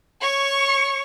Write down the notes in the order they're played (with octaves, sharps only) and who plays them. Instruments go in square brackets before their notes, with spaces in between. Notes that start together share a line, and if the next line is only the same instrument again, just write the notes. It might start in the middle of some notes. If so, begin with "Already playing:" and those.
[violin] C#5 C#6